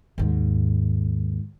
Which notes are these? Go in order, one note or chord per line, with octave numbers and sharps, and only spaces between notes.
D#2 G#2